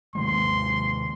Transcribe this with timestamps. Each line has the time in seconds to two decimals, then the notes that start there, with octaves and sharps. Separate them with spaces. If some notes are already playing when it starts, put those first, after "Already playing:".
0.15 C3 D#3 G#3 C6